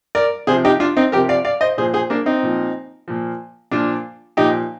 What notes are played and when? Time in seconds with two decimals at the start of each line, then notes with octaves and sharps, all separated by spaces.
0.15 A#4 D5
0.47 C3 G#4 C5
0.51 F3
0.65 D#4 G4
0.80 D4 F4
0.97 C4 D#4
1.12 C3 F3 G4 A#4
1.29 D5 F5
1.45 D5 F5
1.61 C5 D#5
1.77 A#2 G#4 C5
1.81 F3
1.93 G#4 C5
2.10 A#3 D4
2.26 C4 D#4
2.43 A#2 F3
3.08 A#2 F3
3.71 A#2 F3 D4 F4
4.37 A#2 F3 D#4 G4